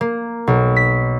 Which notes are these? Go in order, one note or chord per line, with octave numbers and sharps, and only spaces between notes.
A#3
B1
B6